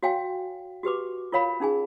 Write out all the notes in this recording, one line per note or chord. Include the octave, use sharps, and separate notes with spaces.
F#4 C#5 F5 G5 G#5
F#4 G4 B4 D6
F4 A#4 C#5 F5 B5
C#4 D#4 G#4 G#5